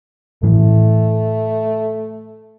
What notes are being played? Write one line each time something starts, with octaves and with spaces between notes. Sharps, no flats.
A2 E3 A3